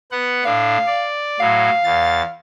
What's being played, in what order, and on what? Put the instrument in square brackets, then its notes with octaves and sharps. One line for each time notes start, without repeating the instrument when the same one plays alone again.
[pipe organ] B3 F#5
[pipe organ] A2 D4 [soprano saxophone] F5
[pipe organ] D5
[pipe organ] A2 F#3 [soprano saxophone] F5
[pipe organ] E2 A6